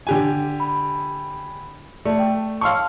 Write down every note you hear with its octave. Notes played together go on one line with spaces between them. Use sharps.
D3 G4 G#5
B5
A3 D5 A5
G5
F5 A5 C6 C#6 E6 F6